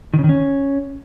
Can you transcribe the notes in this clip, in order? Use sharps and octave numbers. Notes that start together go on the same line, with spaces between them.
D#3
C#3
D#3
C#4